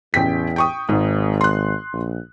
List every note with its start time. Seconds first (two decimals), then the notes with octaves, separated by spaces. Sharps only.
0.14 A1 E2 G5 B6
0.56 G5 C#6 D#6
0.89 G#1 G#2
1.41 C6 F#6
1.93 A#1